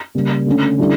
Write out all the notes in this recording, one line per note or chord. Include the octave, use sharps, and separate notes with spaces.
C#3 G3 A#3
D3 A3 C#4
D3 G3 C#4 E4 A4